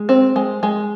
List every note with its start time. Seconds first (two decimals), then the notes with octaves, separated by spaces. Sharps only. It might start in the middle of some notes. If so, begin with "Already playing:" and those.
Already playing: G#3
0.09 C4
0.36 G#3
0.63 G#3